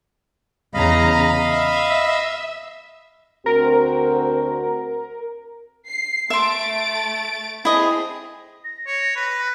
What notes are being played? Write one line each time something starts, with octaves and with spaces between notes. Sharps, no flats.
E2 C#3 D#5 F5 A#5 B5
E5 E6
D2 C4 F#4 A#4
C7
A3 E5 C6 A6 D7
A3 C4 E4 G#4 D#5
A#6
C#5
B4